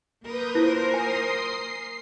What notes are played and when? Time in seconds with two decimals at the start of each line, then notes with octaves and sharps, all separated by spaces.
0.25 A#3 A#4 B4 D#6 G6
0.55 E4 F4 C5
0.94 G#5 C6 D#6 C7
1.43 C7